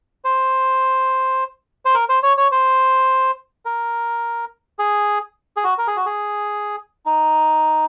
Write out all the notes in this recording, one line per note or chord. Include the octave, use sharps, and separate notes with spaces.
C5
C5
A#4
C5
C#5
C#5
C5
A#4
G#4
G#4
F#4
A#4
G#4
F#4
G#4
D#4